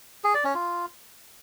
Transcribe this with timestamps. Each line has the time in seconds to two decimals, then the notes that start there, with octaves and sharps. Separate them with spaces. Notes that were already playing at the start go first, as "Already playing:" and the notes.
0.24 G#4
0.34 D5
0.44 C#4
0.55 F4